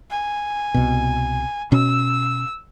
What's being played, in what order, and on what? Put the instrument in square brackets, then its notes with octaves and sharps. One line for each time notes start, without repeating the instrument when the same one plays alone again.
[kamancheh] G#5
[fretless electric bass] C2 B2
[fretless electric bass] B2 C#4 [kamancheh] E6